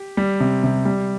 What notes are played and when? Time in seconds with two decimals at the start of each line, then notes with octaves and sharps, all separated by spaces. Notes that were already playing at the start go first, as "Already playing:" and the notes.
Already playing: G4
0.17 G3
0.40 C3
0.63 C3
0.85 G3